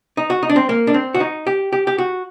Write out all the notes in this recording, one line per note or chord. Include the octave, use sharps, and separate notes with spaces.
D#4
F#4
D#4
D4
C4
A#3
D4
C4
F#4
D#4
G4
G4
G4
F#4